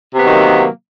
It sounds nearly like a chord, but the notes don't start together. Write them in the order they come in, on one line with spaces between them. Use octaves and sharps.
C3 B3 F#3 D#3 A#3